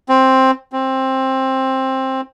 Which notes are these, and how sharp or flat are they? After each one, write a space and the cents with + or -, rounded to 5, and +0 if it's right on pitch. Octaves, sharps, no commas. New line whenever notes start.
C4 +10
C4 +15